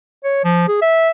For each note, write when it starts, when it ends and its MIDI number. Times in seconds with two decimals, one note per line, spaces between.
0.24 0.41 73
0.44 0.68 53
0.68 0.78 68
0.82 1.10 76